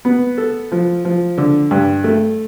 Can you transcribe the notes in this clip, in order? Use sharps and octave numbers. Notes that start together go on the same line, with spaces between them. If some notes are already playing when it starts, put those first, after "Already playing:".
B3
A4
F3
F3
D3
G2
A3